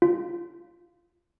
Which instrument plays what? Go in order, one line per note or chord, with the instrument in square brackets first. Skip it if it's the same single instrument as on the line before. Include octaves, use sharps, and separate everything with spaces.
[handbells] F4